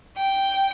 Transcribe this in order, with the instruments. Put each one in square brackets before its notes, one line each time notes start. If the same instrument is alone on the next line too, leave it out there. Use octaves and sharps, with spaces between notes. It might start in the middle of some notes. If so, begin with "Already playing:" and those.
[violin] G5